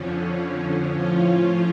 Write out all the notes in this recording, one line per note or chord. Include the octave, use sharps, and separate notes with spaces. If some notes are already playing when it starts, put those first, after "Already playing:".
Already playing: F2 D3 F3 C#4
A2 F3 C#4 F4